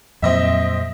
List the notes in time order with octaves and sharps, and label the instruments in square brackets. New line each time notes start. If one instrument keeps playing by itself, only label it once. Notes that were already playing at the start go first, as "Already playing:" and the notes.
[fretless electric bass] F2 A#2 F#3 [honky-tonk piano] C4 D#5 E5